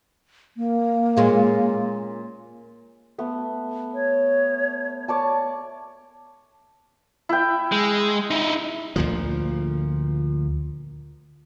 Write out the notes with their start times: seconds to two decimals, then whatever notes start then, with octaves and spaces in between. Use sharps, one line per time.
0.57 A#3
1.17 A#2 G#3 C#4
3.18 A3 B3
3.94 C#5
5.08 C#5 D5 A5
7.29 E4 G5
7.72 G#3
8.31 D#4 E4
8.96 D2 A#2 F3